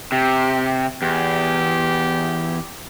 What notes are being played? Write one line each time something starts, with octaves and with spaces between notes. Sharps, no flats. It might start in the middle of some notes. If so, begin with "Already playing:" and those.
C3 G4
E2 G4